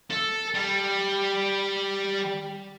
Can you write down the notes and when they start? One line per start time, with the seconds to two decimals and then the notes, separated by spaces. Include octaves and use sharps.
0.11 A4
0.54 G3